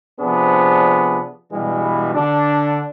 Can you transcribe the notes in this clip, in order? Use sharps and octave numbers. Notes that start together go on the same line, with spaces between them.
C3 F3 B3 D4 G#4
G2 B2 E3 G3 G#3
D3 D4